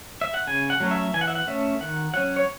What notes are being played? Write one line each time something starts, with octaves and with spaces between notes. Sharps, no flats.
E5
F#5
C#3 G#5
F#5
F#3 A3 C#4
E5
E3 G#5
F#5
E5
F#5
A3 C#4 E5
D#3 F#5
F#3 C#4 F#5
C#5